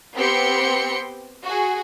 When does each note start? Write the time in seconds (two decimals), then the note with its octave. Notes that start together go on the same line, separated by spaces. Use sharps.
0.15 B3 C4 G4 G5 C6 C#7
1.44 F#4 G#4